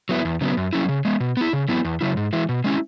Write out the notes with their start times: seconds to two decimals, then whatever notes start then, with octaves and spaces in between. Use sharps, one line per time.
0.09 F#3 B3 E4
0.25 E2
0.41 C#3 F#3 B3
0.57 F#2
0.73 F#3 C#4 E4
0.89 C#3
1.05 G#3 B3
1.20 B2
1.37 B3 E4
1.53 C#3
1.69 F#3 B3 E4
1.85 E2
2.01 C#3 F#3 E4
2.17 G#2
2.33 E3 G#3 E4
2.49 B2
2.64 G#3 C#4 E4